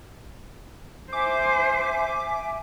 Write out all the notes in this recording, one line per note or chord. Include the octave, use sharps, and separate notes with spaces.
C5 E5 G#5 D6